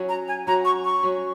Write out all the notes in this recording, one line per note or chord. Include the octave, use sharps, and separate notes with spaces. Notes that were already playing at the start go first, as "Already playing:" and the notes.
Already playing: F#3 C#4 F#4
A#5
G#5
F#3 C#4 F#4 A#5
C#6
C#6
F#3 C#4 F#4